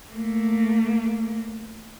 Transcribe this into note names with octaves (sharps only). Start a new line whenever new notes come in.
A3 A#3